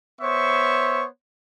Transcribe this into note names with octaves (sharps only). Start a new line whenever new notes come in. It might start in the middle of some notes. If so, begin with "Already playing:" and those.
B3 C5 C#5 E5 C#6